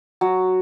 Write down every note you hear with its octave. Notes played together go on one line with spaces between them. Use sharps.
F#3